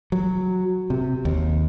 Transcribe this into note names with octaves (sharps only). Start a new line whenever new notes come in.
F#3
C3
D#2